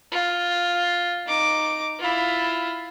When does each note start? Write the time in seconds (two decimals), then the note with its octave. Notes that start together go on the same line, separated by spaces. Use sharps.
0.12 F4
1.26 D#4 D6
1.99 E4 F4